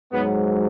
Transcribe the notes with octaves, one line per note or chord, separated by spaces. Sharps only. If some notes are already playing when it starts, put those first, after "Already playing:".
G#2 F#3 B3